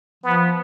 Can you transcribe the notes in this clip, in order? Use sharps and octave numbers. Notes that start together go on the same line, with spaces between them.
F3 B3